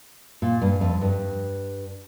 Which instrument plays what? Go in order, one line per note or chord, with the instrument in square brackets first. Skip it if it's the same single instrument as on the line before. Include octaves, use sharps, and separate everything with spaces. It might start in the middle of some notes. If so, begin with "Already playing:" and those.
[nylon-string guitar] A#2
G2
F2
G2